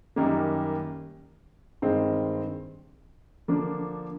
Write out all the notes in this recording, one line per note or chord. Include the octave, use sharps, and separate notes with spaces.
F#2 D#3 G3 A#3
G2 D#3 G#3 C4
D3 F3 A#3 D4